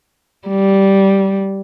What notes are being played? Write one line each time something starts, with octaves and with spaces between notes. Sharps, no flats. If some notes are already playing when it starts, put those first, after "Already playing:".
G3